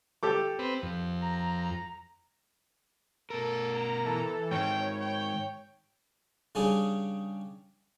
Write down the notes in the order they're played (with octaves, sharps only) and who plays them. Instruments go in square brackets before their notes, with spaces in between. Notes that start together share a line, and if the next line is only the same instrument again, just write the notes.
[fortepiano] G4 A4 D6
[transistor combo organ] C4 B4
F2
[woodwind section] A#5
[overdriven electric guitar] B2 A#4 [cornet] A4
[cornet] A#5
[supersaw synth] E3 A4
[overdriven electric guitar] G#2 D#3 [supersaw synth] C#5 [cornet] G5
[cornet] G5
[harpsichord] C#3 G3 C#4 D4 G4 G#4